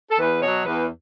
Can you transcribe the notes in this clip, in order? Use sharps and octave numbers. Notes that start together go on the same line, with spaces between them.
A4
E2 B4
B2 F#3 C#5
E2 B4